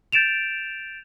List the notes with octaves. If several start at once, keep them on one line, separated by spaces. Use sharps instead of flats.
G6 A6 D7 E7 F7